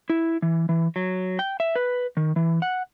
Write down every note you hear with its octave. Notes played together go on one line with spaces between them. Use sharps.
E4
E3
E3
F#3
G5
E5
B4
D#3
E3
F#5